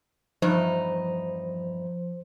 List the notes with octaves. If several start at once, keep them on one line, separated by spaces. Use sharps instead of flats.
E2 G2 F3 D#4 C5